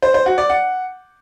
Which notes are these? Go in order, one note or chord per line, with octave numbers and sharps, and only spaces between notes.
C5
C5
F#4
D5
F#5